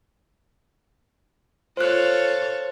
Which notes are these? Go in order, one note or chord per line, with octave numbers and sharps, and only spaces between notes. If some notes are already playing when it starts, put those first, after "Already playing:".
F4 A4 C5 C#5 F#6